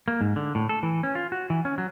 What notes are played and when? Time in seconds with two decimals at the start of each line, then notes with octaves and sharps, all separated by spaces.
0.08 A#3
0.21 G#2
0.36 D3
0.55 A2
0.69 A4
0.83 E3
1.03 C#4
1.15 F4
1.32 F#4
1.50 E3
1.65 C#4
1.78 F#3